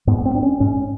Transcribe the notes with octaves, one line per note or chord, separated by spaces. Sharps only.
G#2 B3
C4
D4
C#4
G#2 C#4